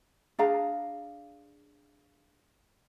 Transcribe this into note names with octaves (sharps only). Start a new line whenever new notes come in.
D4 G#4 F5 A#5